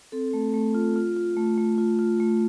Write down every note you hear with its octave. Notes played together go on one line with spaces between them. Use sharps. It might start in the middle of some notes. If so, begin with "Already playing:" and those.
C4 A4
A3
A3
F4
F4
F4
A3
A3
F4
F4
A3